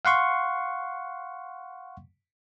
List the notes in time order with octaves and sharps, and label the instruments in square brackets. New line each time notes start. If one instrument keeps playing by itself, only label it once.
[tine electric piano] F5 F#5 C6 C#6